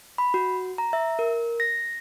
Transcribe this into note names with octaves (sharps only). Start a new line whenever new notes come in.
B5
F#4
A#5
E5
A#4
A#6